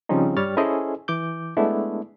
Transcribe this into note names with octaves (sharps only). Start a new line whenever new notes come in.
C#3 F3 G3 C4 C#4 D#4
G2 G3 C#5 F6 A6
C#4 E4 G#4 A4 C5 D#5
E3 D6 G6
G#3 A3 B3 D4 E4